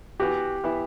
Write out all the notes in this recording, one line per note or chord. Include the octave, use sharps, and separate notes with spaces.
E3 B3 F#4 G4
E3 B3 E4